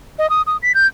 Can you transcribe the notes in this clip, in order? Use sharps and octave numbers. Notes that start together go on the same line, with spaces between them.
D#5
D#6
D#6
B6
G6